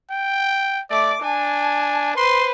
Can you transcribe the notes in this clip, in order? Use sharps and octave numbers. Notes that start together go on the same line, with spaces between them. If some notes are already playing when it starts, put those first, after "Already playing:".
G5
A3 D5 D6
D4 G#5 A5
B4 C5 C6